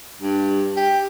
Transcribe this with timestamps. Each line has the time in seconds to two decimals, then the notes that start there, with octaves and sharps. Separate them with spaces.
0.21 G2
0.77 G4